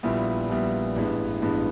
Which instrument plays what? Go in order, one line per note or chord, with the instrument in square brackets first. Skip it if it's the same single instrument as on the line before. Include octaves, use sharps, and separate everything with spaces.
[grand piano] A#1 A#2 G3 B3 E4
A#1 A#2 G3 B3 E4
A1 G2 E3 G#3 B3
A1 G2 E3 G#3 B3